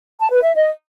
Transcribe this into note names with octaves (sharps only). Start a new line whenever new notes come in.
A5
B4
E5
D#5